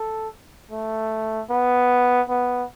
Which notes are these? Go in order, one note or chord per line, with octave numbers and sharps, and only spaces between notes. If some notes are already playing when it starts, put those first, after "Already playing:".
Already playing: A4
A3
B3
B3